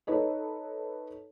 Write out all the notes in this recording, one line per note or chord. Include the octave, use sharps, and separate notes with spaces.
D#4 A4 B4 C#5 D#5